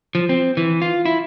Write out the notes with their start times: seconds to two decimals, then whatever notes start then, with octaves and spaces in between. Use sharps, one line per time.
0.15 F3
0.29 C4
0.57 E3
0.82 F4
1.06 E4